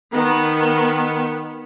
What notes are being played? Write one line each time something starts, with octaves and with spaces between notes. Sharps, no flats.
D#3 B3